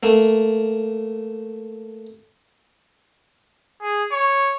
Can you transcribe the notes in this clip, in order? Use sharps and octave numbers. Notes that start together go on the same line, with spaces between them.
A3 A#3
G#4
C#5